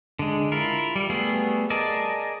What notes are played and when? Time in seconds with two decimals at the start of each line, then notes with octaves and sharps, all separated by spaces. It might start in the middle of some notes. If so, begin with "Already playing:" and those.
0.19 D3 G#3
0.52 E4 F4 A#4
0.96 G3
1.10 G3 A3 B3 G#4
1.70 G#4 A#4 D5 D#5 A5